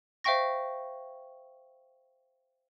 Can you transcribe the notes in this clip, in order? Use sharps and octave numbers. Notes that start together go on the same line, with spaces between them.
C5 E5 F5 G5 C#6 A#6